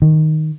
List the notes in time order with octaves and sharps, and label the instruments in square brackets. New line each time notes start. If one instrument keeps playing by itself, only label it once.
[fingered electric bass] D#3